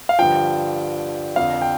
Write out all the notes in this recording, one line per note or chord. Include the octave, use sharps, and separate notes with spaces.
F5
G2 D3 F3 G5
F2 D3 F3 F5
G5